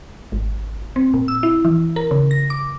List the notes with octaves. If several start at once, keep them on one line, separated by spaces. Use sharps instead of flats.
G#1
C4
A#2
E6
E4
E3
A#4
C#3
A#6
D6